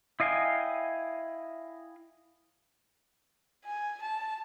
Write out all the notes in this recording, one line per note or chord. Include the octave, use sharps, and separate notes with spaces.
E4 D#5 F5 G5 G#5
G#5
A5